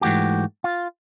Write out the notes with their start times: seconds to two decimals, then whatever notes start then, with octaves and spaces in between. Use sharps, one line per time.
0.01 G#2 E3 A3 F#4 G4
0.64 F4